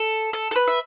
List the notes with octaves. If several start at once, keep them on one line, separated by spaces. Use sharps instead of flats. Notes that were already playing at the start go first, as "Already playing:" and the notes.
Already playing: A4
A4
A4
B4
E5